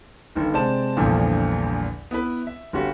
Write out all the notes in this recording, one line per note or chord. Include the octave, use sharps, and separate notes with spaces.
G1 D#3
C3 G#3 C5 D5 A5 E7
A#1 E2 G2 A#2 D3 F3
B3 E4 B4
E5
G1 C#4 F#4 G4